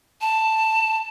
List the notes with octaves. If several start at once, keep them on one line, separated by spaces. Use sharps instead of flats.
A5